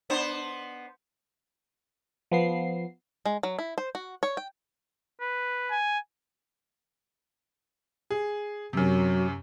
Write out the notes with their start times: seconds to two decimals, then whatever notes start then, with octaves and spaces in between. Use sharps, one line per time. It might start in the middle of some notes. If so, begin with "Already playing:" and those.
0.10 B3 D4 C5
2.32 F3 B3 C7
3.26 G#3
3.43 F#3
3.59 E4
3.78 C5
3.95 F#4
4.23 C#5
4.37 G5
5.21 B4
5.71 G#5
8.10 G#4
8.73 F#2 C3 F#3